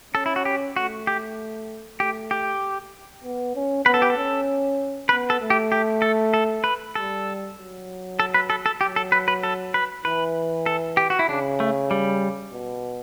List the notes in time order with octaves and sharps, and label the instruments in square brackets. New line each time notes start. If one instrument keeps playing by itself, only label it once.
[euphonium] C#4 [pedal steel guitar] A4
[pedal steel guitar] E4
F#4
G4
[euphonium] A3 [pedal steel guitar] F#4
[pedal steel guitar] G4
[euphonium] A3 [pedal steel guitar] G4
[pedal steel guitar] G4
[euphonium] B3
C#4
[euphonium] B3 [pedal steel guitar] B4
[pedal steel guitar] A4
G4
A4
[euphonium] C#4
[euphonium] B3 [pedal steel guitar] B4
[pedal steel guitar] A4
[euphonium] A3
[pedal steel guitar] G4
G4
A4
A4
B4
[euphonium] G3 [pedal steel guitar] A4
[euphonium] F#3
[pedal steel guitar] A4
B4
A4
A4
[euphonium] F#3 [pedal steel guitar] G4
[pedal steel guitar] A4
B4
B4
A4
B4
[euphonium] E3 [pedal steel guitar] B4
[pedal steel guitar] A4
G4
F#4
E4
[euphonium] C#3 [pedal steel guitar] D4
[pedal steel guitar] A3
G3
[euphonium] B2